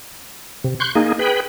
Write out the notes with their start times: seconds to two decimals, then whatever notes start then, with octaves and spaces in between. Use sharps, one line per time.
0.64 C3
0.80 C6 C#6 F#6 G6
0.95 A#3 D#4 G#4
1.19 G#4 B4 G5 B5